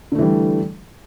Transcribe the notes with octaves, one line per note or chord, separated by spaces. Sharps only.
D3 E3 G3 A3